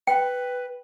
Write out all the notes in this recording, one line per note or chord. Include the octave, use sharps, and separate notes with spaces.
B4 G5